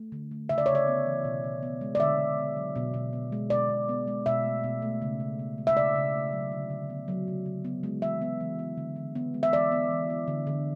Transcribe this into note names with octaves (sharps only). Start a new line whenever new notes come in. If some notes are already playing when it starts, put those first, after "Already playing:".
Already playing: A3
D3
A3
C#3 E5
D5
C#3 C#5
D5
B3
E3
B2
B2
B3
G#3
D5
D3 E5
D3
B3
F#3
B2
B2
B3
G#3
B2 D5
B2
B3
G#3
B2 E5
A3
B2
A3
C#3
C#3
B3
G#3
E5
C#3 D5
C#3
A3
F#3
D3
D3
B3
F#3
C#3
C#3
B3
G#3
E3 E5
B3
E3
B3
D3
D3
B3
G#3
E5
E3 D5
B3
E3
B3
D3
D3